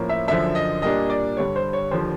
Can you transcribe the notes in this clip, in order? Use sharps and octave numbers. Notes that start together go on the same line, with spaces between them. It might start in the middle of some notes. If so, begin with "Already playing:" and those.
Already playing: A2 F3 A#3 C#4
E5
F#2 D3 F3 E5
D#5
A#2 G3 A#3 D4 D#5
D5
G2 D3 G3 C#5
C5
C#5
D#2 D3 F3 C5